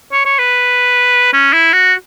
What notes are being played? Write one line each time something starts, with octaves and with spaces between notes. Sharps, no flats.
C#5
C#5
B4
C#4
E4
F#4